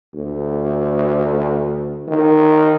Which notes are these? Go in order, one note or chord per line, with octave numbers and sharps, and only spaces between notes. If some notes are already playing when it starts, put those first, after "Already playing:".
D2
D#3